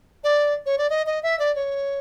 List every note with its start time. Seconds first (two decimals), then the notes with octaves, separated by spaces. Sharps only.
0.24 D5
0.66 C#5
0.78 D5
0.90 D#5
1.06 D#5
1.23 E5
1.39 D5
1.56 C#5